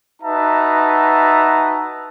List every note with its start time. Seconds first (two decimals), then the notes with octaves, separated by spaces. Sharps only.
0.22 D#4 F#4 B4 E5 A5 A#5